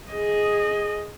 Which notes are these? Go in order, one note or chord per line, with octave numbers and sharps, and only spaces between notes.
G#4 D#5